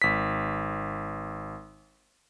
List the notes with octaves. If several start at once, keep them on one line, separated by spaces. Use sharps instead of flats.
G#1 B6